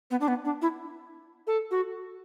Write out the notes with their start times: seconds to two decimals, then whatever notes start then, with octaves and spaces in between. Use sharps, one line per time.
0.11 B3
0.21 D4
0.28 B3
0.45 D4
0.62 E4
1.47 A4
1.71 F#4